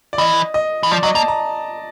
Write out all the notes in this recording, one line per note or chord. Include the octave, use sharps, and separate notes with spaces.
D5
E3 D#5
D#5
E3
F3 D5
F#3 D#5
A#3 A5
A#5